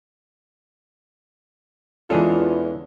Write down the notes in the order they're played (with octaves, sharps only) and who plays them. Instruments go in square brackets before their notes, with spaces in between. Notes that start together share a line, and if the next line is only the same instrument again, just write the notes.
[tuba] E2 [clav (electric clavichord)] E3 G#4 A4 [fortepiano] G#3 C#4 D4 [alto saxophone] F4